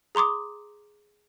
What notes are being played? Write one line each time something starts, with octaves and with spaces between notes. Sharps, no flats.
G#4 A#5 C6 D6 D#6